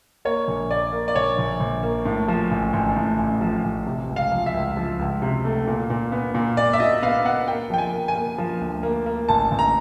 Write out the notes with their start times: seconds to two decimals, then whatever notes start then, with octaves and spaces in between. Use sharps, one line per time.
0.25 A#3 C#5
0.48 A#1
0.70 A#3 D5
0.93 A#3
1.08 D5
1.15 A#1 C#5
1.38 A#1
1.60 A#1
1.83 A#3
2.06 A2
2.28 F3
2.51 A1
2.73 A1
2.96 A2
3.19 A1
3.41 F3
3.64 A1
3.86 C3
4.09 C#2
4.16 F5
4.31 F3
4.46 E5
4.54 C#2
4.77 F3
4.99 C#2
5.22 C3
5.45 A3
5.67 A#2
5.90 A#2
6.12 B3
6.35 A#2
6.57 A#2 D5
6.73 E5
6.80 A#2 D#5
7.02 B3 F5
7.25 B3 F#5
7.48 A#3 G5
7.70 F3 G5
7.78 G#5
7.93 A#3
8.08 G#5
8.16 A#3
8.38 F3
8.61 D2
8.83 A#3
9.06 A#3
9.29 A1 A5
9.51 A1
9.59 A#5